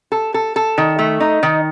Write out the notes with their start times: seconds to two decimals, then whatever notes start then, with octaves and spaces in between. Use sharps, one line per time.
0.12 A4
0.34 A4
0.56 A4
0.78 D#3
0.99 A3
1.20 D#4
1.43 D#3